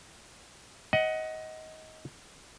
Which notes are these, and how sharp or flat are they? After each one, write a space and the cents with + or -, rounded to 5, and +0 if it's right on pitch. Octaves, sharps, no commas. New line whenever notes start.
D#5 +20 F#5 +10